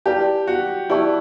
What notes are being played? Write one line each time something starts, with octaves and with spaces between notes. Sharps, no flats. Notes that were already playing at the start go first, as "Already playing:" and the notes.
E4 G4 B4 D5 A5
F#4
E4 G4 B4 D5 A5 C#6